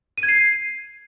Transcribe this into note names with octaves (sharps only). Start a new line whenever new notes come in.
D#7
G#6
C7